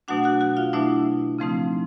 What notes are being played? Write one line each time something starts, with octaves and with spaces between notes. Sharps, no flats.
B2 F#3 A3 D4 F#4 F#5
F#4 F#5
F#4 F#5
F4 F5
B2 F#3 A3 D4 E4 E5
C#3 F3 A3 C4 D#4